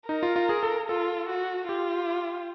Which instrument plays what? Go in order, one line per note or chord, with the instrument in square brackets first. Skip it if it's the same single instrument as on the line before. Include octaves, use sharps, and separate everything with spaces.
[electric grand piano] D#4 [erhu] A#4
[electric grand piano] F4
F4
G#4
A4
[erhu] F4 [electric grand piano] A4
[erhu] F#4
[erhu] F4 [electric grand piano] G4